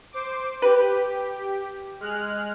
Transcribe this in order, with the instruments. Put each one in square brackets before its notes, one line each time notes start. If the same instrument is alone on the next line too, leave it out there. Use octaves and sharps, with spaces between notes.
[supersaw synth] C5 D6
[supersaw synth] G4 [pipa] B4
[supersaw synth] G#3 F6 F#6